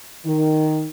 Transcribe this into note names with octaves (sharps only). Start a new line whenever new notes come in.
D#3